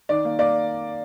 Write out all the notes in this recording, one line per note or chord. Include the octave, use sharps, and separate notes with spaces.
D#3 D5
A#3
A#3 D5